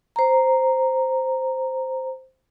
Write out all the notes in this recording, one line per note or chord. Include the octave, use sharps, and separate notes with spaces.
C5 A#5